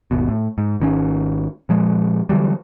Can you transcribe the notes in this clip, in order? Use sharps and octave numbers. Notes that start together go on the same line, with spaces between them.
G#1 D#2 B2
A2
G#2
G#1 D#3 C#4
A#2 F3 G#3
D3 E3 F#3 G3